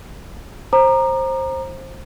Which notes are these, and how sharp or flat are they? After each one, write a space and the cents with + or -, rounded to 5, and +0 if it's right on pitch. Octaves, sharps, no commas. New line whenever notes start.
C5 +20 A#5 +0 D6 +45